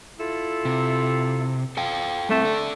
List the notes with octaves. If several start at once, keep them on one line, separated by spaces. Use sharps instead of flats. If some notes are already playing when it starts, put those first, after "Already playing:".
E4 F4 A4
C3
A4 F5 G5
G3 A3 C4
A4 D5